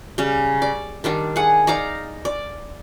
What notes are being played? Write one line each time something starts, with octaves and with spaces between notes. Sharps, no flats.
C#3 G3
D5
D#3 G3 D4
G#4 F#5
D#4 D5 F5 A#5
D5